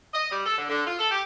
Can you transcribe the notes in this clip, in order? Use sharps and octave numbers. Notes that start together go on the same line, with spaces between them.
D#5
G3
A4
D3
D3
F4
A4
G4